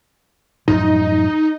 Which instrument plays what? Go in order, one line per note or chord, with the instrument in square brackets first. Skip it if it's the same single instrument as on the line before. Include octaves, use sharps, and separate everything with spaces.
[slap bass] F#2 A2 F3 [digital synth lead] D#4